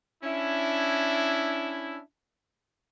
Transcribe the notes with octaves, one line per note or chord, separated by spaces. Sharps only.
C#4 D4 E4